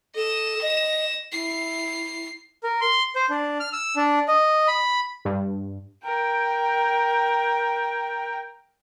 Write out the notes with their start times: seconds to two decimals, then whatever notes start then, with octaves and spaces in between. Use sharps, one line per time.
0.15 A4 D#5 E7
0.62 D#5 A#6 E7
1.32 E4 C7
2.63 A#4
2.81 C6
3.15 C5
3.30 D4
3.60 F6
3.73 E6
3.96 D4
4.28 D#5
4.68 B5
5.25 G2
6.05 A#4 G5